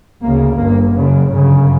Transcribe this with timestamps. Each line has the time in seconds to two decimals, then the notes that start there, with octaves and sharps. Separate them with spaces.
0.22 D2 C#3 A#3
0.58 G1 G2 A#3
0.94 F#1 F#2 C#3
1.31 G1 F#2 C#3